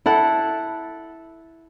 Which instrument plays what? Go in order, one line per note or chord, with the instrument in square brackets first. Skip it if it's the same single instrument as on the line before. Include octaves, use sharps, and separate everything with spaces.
[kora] E4 A4 F#5